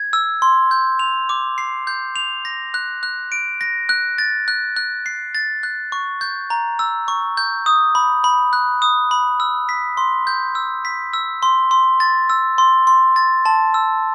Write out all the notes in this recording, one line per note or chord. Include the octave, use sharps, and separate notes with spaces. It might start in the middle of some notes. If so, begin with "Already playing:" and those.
Already playing: G#6
E6
C6
G6
F7
D6
C7
G6
F7
A#6
F#6
F#6
D7
A#6
F#6
A6
F#6
F#6
C7
A6
F#6
C#6
G6
A#5
E6
C#6
G6
D#6
B5
B5
F#6
D#6
B5
E6
B6
C6
G6
E6
B6
E6
C6
C6
A6
E6
C6
C6
A6
A5
E6